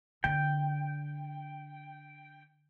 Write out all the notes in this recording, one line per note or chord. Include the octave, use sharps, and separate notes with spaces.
D3 G5